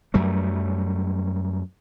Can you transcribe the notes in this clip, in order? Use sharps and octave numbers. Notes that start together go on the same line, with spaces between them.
F#2 F#3 G3 A3